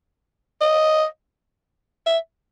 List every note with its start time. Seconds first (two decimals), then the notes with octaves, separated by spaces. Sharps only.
0.61 D#5
2.07 E5